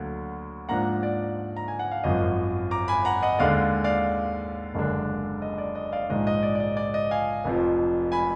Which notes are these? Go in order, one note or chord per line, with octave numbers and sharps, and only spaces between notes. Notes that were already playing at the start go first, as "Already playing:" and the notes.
Already playing: D2 D3 F#3 A#3
G#2 F3 A#3 D4 F#5 A#5
D5
A#5
G#5
F#5
F5
G#1 F#2 F3 D#5
A#5 D6
G#5 B5
F#5 A#5
D#5 F#5
D#2 D3 G#3 D5 F5
D5 F5
F#1 F#2 D3 G#3 D4
D#5
D5
D#5
D5 F5
A#1 G#2 D#3 G#3 D#5
D#5
D5
D5
D#5
D5
D#5
F5 G#5
F1 F2 F3
G#5 B5